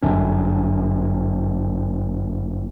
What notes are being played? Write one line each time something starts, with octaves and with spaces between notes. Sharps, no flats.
G1 F#2 D3 C#4